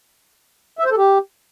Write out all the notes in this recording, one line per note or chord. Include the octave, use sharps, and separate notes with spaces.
E5
C5
A4
G4